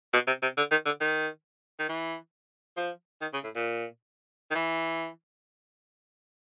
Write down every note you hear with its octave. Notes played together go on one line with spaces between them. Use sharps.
B2
C3
C3
D3
D#3
D3
D#3
D#3
E3
F3
D#3
C#3
A2
A#2
D#3
E3